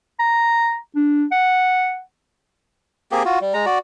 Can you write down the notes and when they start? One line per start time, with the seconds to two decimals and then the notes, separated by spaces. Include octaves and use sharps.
0.20 A#5
0.96 D4
1.32 F#5
3.12 A#3 C4 G4 G#4
3.25 F4 F#4
3.41 G3
3.54 G#3 A#5
3.66 F#4 D5